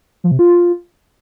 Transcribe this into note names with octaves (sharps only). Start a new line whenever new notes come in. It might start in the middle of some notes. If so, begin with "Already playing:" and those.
F3
C3
F4